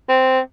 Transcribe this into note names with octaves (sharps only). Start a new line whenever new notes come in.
C4